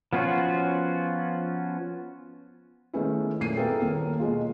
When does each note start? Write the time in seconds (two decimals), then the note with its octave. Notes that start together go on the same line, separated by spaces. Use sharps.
0.13 F3 B3 C#4 F4 F#4
2.93 D#3 G#3 A3 B3 C#4 E4
3.40 F#2 A#2 A3 C7 D#7
3.56 A#3 B3 E4 G#4 A4 G5
3.82 D#1 A#3
4.19 B2 G#3 F4